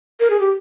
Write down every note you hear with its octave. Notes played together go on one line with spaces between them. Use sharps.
A#4
G#4
G4